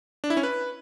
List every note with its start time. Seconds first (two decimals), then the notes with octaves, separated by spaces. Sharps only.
0.24 D4
0.30 E4
0.37 C#4
0.43 B4